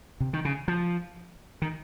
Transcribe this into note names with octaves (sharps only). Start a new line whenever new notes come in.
C3
D#3
C#3
F3
D#3